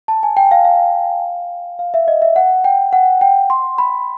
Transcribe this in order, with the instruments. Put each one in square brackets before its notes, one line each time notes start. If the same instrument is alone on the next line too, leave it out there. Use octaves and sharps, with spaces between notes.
[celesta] A5
G#5
G5
F5
F5
F5
E5
D#5
E5
F#5
G5
F#5
G5
C6
B5